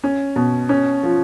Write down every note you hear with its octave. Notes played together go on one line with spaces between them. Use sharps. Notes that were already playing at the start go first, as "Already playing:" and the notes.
C#4
B2
C#4
F3